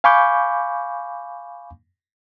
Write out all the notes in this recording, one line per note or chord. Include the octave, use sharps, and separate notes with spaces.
F5 G#5 B5 C#6 D6 G6